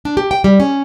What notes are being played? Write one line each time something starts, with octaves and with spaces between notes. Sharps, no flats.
D4
G4
G5
G3
C#4